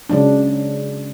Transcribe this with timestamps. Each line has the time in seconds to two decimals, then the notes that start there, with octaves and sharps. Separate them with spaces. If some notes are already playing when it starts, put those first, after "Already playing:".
0.09 C#3 F#3 G#3 D4